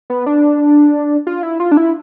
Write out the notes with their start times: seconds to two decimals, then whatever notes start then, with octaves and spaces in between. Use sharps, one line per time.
0.10 B3
0.26 D4
1.27 F4
1.43 E4
1.60 F4
1.72 D4
1.77 E4